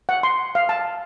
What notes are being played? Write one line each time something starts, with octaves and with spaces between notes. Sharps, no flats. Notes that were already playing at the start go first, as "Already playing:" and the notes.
F#5
C6
F5
A5